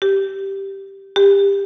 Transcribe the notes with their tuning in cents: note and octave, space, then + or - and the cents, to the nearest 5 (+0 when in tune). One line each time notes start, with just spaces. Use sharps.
G4 -5
G4 +20